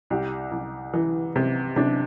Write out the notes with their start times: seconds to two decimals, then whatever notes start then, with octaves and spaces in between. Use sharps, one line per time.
0.10 C2 G4
0.51 C2
0.94 E3
1.36 C3
1.76 C3 D4